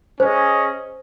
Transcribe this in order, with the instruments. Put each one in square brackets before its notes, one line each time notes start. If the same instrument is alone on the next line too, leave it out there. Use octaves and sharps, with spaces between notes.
[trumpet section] C#4 G#4 D#5 [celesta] C5